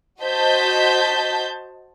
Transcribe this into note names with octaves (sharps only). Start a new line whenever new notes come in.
F#4 C5 D#5 A5 G6 B6